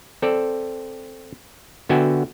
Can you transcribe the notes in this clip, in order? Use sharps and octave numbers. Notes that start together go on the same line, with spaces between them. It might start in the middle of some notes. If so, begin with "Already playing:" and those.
C4 A4 D5
D3 B3 F#4 E5 G5 G#5